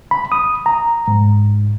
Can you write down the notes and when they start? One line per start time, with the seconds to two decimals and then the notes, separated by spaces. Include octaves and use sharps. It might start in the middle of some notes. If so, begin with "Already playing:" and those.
0.11 B5
0.32 D#6
0.66 A#5
1.08 G#2